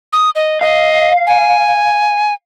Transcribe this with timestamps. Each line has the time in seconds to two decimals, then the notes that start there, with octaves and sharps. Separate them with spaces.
0.13 D#6
0.35 D#5
0.61 D#5 F5
1.27 G#5